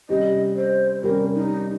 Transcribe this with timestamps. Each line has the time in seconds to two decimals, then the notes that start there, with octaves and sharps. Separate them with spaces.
0.09 C3 G3 C#4 D#5
0.56 C5
1.03 C3 G3 C#4 A#4
1.34 D#4